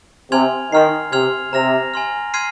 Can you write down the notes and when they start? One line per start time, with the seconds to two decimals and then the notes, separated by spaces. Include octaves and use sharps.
0.31 C3 G#5 C6 F6 G#6 F7
0.72 D#3 C6 F6 C7
1.12 C3 C6 F6 G#6 F7
1.52 C3 A#5 F6 A#6 F7
1.94 G#5 C6 F6
2.34 C6 F6 G#6 C7 D#7